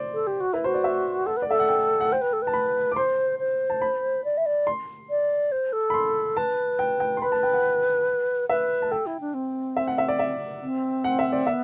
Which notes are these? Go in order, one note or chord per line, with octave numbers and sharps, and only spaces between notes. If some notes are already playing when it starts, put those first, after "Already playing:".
Already playing: C5 D5
A4
G4
F#4
E4 B4
F#4 C5
D5
E5
A4 F#5
B4
D5
A4 E5
F#5
G5
F#5
C5 G5
B4
A4
B4
A5
B5
D6
C5 C6
C5
A5
B5
D5
E5
D5
C6
D5
C5
A4
B5
C6
B4 A5
G5
G5
C6
B4 B5
A5
G5
F#5
B4 E5
A5
A4 G5
E4
D4
C4
E5
F#5
E5
D5
E5
C4
F#5
E5
D5
B3 E5